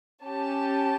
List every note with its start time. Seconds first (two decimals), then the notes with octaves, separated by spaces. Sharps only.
0.24 C#4 G4 A5